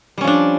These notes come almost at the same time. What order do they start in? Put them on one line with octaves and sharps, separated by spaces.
G3 C#4 F3 D4